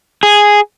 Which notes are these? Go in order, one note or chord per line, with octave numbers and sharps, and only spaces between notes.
G#4